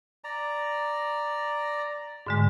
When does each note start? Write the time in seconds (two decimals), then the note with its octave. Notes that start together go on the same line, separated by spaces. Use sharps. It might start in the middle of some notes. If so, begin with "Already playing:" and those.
0.24 D5 A#5
2.27 G#2 D3 G#3